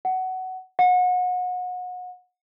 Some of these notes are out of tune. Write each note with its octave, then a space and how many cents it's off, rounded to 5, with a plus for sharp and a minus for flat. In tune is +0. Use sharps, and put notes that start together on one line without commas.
F#5 +15
F#5 -30